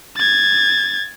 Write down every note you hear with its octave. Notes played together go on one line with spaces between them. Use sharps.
G#6 A6